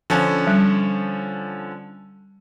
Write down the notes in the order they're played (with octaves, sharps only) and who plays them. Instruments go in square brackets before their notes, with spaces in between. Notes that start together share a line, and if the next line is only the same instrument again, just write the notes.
[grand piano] D3 F3 C#4
[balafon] G3